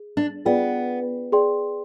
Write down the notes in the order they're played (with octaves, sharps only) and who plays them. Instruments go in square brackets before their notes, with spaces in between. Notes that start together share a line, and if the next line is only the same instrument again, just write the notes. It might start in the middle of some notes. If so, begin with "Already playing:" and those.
Already playing: [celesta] G#4
[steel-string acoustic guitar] D4
[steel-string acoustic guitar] B3 [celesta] F4 G#4 D5 G5
[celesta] G#4 D5 G5 C6